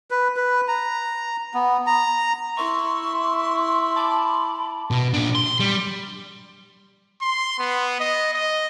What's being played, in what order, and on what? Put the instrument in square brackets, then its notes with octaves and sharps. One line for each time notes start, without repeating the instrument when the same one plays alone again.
[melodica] B4
B4
A#5
B3
A#5
[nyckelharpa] E4 E5 [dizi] C6 [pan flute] C#6
[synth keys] A5 D6 [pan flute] B5
[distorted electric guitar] B2
A#2 D4
C6
G3
[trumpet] C6
B3
D#5
D#5